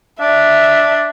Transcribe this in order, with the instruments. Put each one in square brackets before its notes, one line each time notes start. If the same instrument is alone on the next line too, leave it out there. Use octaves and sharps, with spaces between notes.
[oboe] D4 [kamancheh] E5